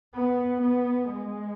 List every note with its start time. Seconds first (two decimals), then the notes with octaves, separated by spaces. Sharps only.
0.15 B3
0.62 B3
1.09 G#3